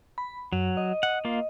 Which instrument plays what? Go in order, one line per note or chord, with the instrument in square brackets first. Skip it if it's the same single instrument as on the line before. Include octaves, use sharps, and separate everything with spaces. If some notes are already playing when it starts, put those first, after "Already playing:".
[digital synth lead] B5
[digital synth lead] F#2 [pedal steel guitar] F#3
[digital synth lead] D#5
[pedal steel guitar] F#5
A#3 F4